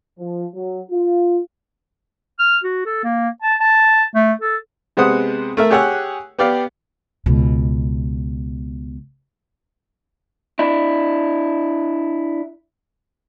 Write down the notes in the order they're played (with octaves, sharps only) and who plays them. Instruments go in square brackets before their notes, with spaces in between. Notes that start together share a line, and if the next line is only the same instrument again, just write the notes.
[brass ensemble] F3
F#3
F4
[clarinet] F6
F#4
A4
A#3
A5
A5
A3
A4
[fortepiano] C3 G#3 B3 C5 F#5 D#6
A3 A#4 E5
G4 G#4 C#5 F#5 E6 F#6
B3 G4 D5 F5
[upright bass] C#2 B2
[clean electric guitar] D4 E4